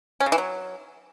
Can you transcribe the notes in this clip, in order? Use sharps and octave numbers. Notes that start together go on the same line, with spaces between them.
C#4
C#3
E3
F#3